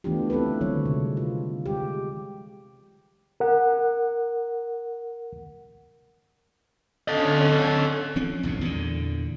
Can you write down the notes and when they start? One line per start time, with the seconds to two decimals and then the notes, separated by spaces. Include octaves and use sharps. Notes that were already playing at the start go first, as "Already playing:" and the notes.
0.04 E3 A3 B3 D4 F4 G4
0.30 C4 E4 A4 B4
0.61 D3 D#3 F#3 G3 C#5
0.85 C3 G#3
1.17 F4
1.66 G#3 G4
3.40 A#4 F#5
7.08 D3 C#4 A4 D#5
8.16 F3 C4 C#4
8.43 B1 E2 G#2 B2
8.61 E2 A#2 D3